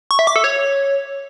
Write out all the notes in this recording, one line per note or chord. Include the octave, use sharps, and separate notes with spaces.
C#6
E5
D6
A4
C#5